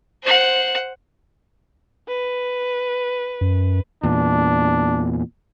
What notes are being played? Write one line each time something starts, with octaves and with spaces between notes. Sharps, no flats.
C5 F#5
B4
F#2
E2 A#2 D4